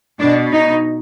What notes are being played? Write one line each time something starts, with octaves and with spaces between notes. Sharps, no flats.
B2 D4
D#4